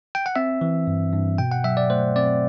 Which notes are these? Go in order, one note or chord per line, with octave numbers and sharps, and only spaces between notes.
G5
F#5
C4 E5
E3
G2
G2
B2 G5
F#5
F#3 E5
D5
A3 C5
C4 D5